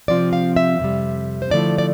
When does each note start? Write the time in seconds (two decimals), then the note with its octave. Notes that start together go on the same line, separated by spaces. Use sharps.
0.08 C3 F3 C4 F4 D5
0.33 F5
0.56 E5
0.79 F2 C3 G3
1.42 C5
1.50 D3 F3 A3 E4 D5
1.78 D5